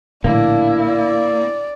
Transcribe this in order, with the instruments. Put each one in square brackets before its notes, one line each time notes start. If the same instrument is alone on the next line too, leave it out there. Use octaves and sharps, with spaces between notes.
[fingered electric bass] A#1 A2 D3 [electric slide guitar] A#3 [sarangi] D4 [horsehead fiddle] E4
[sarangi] D5